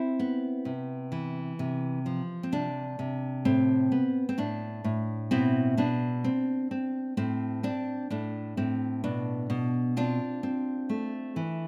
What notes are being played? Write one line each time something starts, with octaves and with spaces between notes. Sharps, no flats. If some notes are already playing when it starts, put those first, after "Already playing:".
Already playing: C4 E4
B3
C3
E3
C3
F3
C4
C3 D4
C3
A2 C4
B3
C4
A2 D4
A2
B2 C4 E4
B2 D4
C4
C4
A2 C4
C4 D4
A2 D4
A2 C4
B2 D4
B2
C4 D4 F4
C4
A3
E3